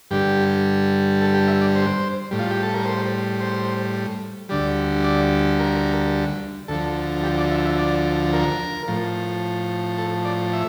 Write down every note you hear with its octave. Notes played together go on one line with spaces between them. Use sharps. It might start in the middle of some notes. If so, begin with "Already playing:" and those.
G2 D3 G3 G4
A4
G4
E5
D5
C5
A2 G3
F4
G4
A4
A#4
C5
C5
D2 D3 G3 D5
D5
A#4
D2 D3 F3 A4
G4
D5
E5
E5
D5
A#4
A2 F3
A4
D5
E5